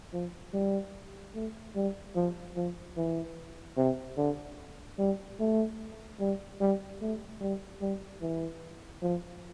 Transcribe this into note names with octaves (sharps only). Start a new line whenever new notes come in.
F3
G3
A3
G3
F3
F3
E3
C3
D3
G3
A3
G3
G3
A3
G3
G3
E3
F3